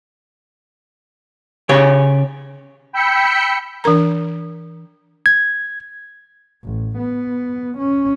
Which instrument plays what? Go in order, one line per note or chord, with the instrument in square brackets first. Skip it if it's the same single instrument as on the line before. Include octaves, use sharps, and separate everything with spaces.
[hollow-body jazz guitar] C#3 G4 C#5
[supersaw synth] G5 B5 E6 G6 B6 C#7
[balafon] E3 D4 A#4 A#5
[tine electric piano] G#6
[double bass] A1
B3
C#4